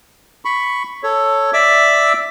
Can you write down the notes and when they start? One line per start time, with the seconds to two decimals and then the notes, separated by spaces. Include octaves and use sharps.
0.45 B5 C#6
1.03 A4 C#5
1.53 D5 E5 D6 E6